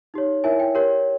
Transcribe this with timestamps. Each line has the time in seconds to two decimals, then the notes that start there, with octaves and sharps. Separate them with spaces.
0.14 D#4 G4 C#5
0.44 E4 A#4 C#5 E5 G#5
0.60 G5
0.75 G4 A#4 C#5